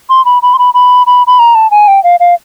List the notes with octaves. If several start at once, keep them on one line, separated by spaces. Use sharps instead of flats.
C6
B5
B5
C6
B5
B5
B5
B5
A#5
A5
G#5
G5
F5
F5